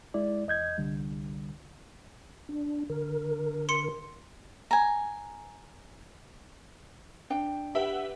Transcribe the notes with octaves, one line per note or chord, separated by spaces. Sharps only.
G#3 E4 D5
E2 D#5 G6 G#6
C2 D3 G3
D4
D3 A#4
C6 C#7
G#5 A#5
D4 G5
G4 B4 E5 F#5